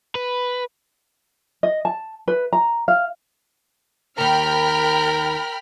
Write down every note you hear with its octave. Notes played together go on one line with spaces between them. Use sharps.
B4
D#5
A5
B4
A#5
F5
D#2 D#3 A#4 G5 B5 F6